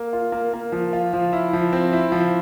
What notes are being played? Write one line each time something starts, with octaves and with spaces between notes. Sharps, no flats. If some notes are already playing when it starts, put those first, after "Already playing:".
Already playing: A#3
F4
A#3
A#3
F3
F4
F3
E4
F3
C4
E4
F3